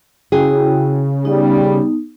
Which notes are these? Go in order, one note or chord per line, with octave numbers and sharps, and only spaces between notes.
C#3 E4 F#4 G#4 G5
G3 B3 D#4